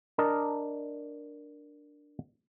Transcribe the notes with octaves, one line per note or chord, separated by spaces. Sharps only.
D4 A#4 D5 D#5